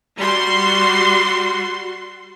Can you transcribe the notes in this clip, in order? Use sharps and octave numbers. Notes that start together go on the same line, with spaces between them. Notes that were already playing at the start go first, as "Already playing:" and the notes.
G3 F#4 C6